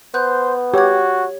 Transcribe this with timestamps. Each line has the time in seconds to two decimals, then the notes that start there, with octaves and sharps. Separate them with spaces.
0.14 B3 C5 F#6 G6
0.74 F#4 G4 C#5 G#6